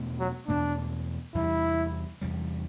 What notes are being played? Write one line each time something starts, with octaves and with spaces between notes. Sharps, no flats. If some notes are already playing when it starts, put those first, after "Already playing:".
Already playing: E2 B2 A3
F#3
E2 B2 A3 D4
E2 C3 G3 E4
E2 C3 G3